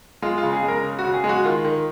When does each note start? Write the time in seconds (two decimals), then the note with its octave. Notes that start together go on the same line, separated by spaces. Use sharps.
0.22 G#3 F4
0.38 F4
0.43 C#3
0.53 G#4
0.63 G#3
0.68 A#4
0.83 C#3
0.99 F#4
1.04 C#3
1.14 G#4
1.24 G#3
1.29 F#4
1.44 D#3 F4
1.65 D#3